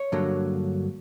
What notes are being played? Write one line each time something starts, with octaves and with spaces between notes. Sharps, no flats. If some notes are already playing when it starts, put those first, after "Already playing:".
Already playing: C#5
G2 D3 F#3 A#3